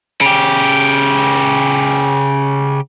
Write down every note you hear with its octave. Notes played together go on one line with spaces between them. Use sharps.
C#3 G4